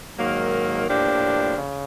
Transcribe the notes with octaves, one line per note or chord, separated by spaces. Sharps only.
G#2 D#3 F#3 A#3
A2 F3 A#3 D4 G4
C#3